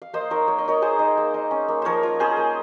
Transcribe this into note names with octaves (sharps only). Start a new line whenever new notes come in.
F5
A#3 C5 D#5
D#4 A#4 C#5
A#3 C#5
D#5
D#4 A#4 C#5
A#3 G#4 C5
D#4
A#3
D#4
C#4
A#3
F3 A#4 C5 C#5
F4
C#4 G#4 C5
A#3